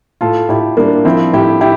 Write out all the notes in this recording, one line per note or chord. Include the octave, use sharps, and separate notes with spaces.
A2 F4 A4
A2 E4 G4
G3 A#3 D4
F3 C4 E4
A2 E4 G4
E4 G4